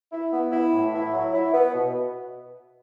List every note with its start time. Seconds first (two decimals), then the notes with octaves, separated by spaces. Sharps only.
0.12 E4
0.32 B3
0.52 E4
0.73 A2
0.93 E4
1.13 F#3
1.33 E4
1.54 B3
1.75 B2